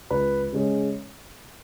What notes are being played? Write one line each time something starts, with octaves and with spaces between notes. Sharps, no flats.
C#2 B4
C#3 G#3 C#4